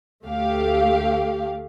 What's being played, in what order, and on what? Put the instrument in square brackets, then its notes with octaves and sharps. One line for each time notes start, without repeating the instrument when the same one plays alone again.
[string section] D2 A3 G4 F5